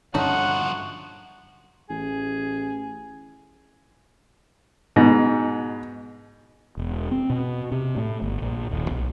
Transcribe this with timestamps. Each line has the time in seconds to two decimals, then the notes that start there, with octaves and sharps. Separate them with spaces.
0.15 G2 D3 F3 A3 C#4 D#4 F#4 F#5
1.90 A1 G#4
4.96 G#2 B2
6.77 E1
7.11 C4
7.30 B2
7.72 C3
7.96 A2
8.22 G1
8.42 A#1
8.71 D#1
8.90 B1